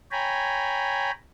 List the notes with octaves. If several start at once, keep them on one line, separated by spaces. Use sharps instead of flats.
C#5 G5 G#5 A#5 B5